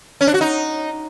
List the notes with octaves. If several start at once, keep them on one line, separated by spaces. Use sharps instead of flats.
C#4
D4
F#4
D#4